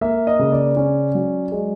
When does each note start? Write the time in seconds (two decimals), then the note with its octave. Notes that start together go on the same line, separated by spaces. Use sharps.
0.01 A#3 E5
0.27 D#5
0.39 C#3
0.52 D5
0.77 C#4
1.15 F#3
1.52 G#3